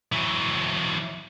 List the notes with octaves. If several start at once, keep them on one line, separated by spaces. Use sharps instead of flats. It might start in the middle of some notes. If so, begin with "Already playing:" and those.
E3 F#3